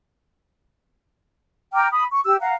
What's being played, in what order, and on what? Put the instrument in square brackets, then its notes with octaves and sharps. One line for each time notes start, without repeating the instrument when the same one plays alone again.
[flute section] G5 A#5 D6 F6
B5 D#6
C#6
G4 E6
F5 F#5 A#5